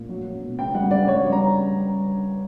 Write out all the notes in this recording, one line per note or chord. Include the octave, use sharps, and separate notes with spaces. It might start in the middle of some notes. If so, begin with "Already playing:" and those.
Already playing: A#2
F#3
F#3
B2
C#3 G5
G3 F#5
C#3 D5
G3 C#5
G3
A#5